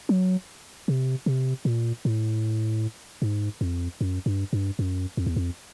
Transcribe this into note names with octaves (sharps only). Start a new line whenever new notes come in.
F#3
C3
C3
A#2
A2
G#2
F2
F#2
G2
G2
F#2
F2
E2
F2